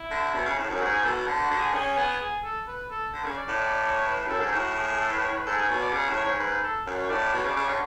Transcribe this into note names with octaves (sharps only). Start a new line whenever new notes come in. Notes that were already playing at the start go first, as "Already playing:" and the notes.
Already playing: E4
D3
B2
C#3
A2
F#2
G#2 F#4
G#4
B2 A4
F#4
D3
F#4
D3
G#4
C#4 G#4
B3
G#4
A4
B4
A4
D3
C#3
D5
A2
D5
D5
C#5
B4
F#2 A4
G#2
A2 F#4
G#4
G#4
A4
B4
C#5
B4
G#2 A4
G#4
B2 C#5
D5
C#3
A2
C#5
G#2
G#2 B4
A4
F#2
C#5
A2 D5
B2 C#5
C#3
D5
C#3
D3 C#5